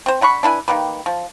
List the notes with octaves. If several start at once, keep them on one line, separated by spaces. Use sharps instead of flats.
C4 C5
D3 F#5 B5 C#6
D4 E4 B4 G#5
D#3 A#3 G4 B4
F3